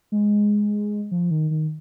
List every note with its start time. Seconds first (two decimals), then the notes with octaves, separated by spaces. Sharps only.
0.12 G#3
1.11 F3
1.31 D#3
1.51 D#3